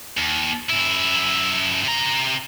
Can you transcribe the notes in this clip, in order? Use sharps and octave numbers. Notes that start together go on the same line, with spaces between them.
D#2
F#2 E4
C3 A#5